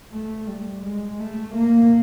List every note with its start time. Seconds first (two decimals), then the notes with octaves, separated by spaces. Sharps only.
0.12 A3
0.47 G3
0.84 G#3
1.19 A3
1.55 A#3